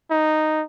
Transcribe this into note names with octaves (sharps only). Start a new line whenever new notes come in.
D#4